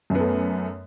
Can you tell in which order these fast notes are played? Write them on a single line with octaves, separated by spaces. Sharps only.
F#2 B3 A3